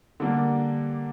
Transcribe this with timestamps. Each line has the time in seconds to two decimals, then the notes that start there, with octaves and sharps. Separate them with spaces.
0.20 D3 G3 A#3 D4